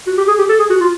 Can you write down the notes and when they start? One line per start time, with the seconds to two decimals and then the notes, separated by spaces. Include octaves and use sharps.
0.07 F#4
0.18 G4
0.28 G#4
0.38 G4
0.49 A4
0.59 G#4
0.70 F#4
0.80 F4